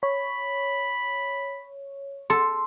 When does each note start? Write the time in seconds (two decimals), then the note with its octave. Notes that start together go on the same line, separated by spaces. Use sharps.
0.03 C#5 B5
2.30 A4 C6